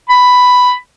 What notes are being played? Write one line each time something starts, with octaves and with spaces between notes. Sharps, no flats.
B5